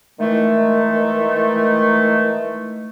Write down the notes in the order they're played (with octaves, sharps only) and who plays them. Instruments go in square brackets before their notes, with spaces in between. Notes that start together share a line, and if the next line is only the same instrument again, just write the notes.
[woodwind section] D#3 E3 G#3 A3